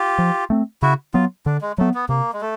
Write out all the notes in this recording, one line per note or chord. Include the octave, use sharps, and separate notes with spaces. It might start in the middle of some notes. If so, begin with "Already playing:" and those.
Already playing: F4 G4
F3
A3 C4
C#3 E4 F#4
F#3 B3 F4
D3 D4
G#3
F#3 A3 B3
B3
C3 A#3
G#3
A3